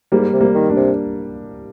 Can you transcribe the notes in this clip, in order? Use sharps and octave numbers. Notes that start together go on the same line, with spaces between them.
G#2 G3 A#3
C3
G3 A#3
D#3
A#3 D4
C3